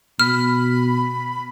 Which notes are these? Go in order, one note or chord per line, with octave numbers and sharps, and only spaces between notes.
B2 B5 F6